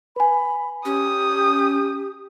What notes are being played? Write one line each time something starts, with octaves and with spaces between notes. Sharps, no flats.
B4 G#5 B5
C#4 G4 D#6